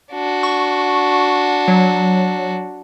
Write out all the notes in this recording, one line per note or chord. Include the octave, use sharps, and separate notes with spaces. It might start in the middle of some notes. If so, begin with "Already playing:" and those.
D4 F#4
C#6
F#3